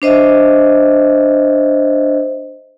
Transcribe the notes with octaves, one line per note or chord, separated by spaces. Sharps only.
D4 C5 D#5 E5